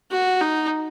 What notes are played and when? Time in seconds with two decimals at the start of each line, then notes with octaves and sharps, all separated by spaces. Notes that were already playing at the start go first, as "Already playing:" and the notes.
0.11 F#4
0.41 D#4